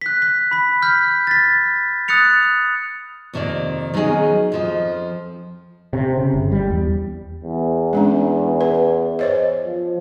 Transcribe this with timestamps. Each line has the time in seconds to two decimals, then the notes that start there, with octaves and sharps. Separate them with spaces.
0.01 F#6 B6
0.22 B6
0.51 B5 B6
0.82 F6 G6 B6
1.27 A6 B6
2.08 D#6 F#6 A6 C#7 F7
3.33 F2 C3 D#3 A#3 D5
3.94 D#3 F#3 B3 C#4 G#4 D#5
4.52 F2 F3 D#5
5.93 C3
6.18 C#3
6.33 G1
6.52 G3
6.70 E2
7.44 E2
7.93 G#3 C#4 D4
8.61 B4
9.19 C5 C#5 D#5
9.66 F3